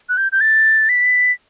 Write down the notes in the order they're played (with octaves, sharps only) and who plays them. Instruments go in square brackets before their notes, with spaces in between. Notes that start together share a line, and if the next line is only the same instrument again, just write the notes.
[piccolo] F#6
G6
G6
A6
B6